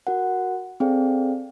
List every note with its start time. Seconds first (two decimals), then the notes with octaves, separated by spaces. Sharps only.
0.07 F#4 A#4 F#5
0.80 C4 G#4 A4 D5 F5 G5